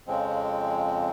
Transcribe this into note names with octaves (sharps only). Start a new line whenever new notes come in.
F2 C#3 F3 G#3 C4